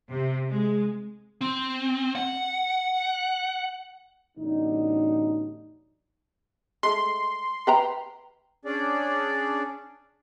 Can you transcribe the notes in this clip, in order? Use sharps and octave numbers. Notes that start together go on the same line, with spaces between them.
C3
G#3
C4
F#5
A1 E2 A2 D3 F#3 D#4
G#3 A3 C6
B4 G5 A#5
C#4 D4 G#4 D5